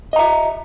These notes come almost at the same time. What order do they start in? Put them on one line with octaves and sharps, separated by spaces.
D#5 A#5 E5